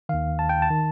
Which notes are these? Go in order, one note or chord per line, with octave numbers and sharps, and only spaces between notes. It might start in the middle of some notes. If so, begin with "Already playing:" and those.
D#2 D#3 F5
A5
G5
A5
D#3